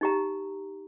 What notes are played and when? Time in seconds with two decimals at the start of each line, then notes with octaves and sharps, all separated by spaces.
0.01 D#4 G4 A#5